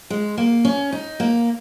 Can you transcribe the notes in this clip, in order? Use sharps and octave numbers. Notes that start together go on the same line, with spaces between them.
G#3
A#3
C#4
D#4
A#3